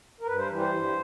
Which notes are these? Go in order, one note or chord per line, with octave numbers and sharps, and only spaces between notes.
A#4
G2 B4
C5
E3 G3
C5
G2